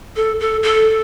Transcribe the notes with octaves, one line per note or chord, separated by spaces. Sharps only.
A4
A4
A4